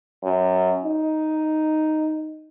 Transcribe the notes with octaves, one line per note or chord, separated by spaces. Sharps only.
F#2
D#4